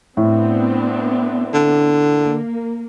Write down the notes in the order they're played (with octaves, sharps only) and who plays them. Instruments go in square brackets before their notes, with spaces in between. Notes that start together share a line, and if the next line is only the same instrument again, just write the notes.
[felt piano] A2 [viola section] B3 C4 D4
[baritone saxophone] D3
[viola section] A#3